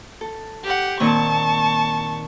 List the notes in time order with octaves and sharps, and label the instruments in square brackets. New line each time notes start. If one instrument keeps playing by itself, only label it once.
[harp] A4
[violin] G4 F#5
[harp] A#2 D#3 C4 [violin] A5 C#6